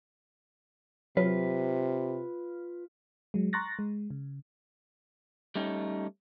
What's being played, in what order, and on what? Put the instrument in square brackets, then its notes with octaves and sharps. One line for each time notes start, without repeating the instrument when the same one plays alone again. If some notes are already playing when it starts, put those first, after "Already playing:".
[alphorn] C3 [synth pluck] F#3 [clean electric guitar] F4 B4
[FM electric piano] F#3 G#3
A#5 C6 C#6 F#6 A6 A#6
G#3
C#3
[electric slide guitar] G3 A3 C#4 D#4